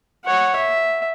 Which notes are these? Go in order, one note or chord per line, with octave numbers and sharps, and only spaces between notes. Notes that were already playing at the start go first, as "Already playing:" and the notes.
C#5 F#5
E5